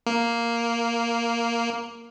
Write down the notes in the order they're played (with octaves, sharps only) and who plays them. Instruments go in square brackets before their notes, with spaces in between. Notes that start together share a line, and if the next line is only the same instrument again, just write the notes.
[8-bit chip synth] A#3